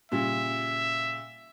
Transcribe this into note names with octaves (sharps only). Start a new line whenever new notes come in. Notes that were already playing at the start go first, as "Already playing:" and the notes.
A#2 C#3 G3 E5